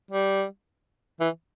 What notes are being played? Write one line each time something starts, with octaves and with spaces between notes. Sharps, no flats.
G3
E3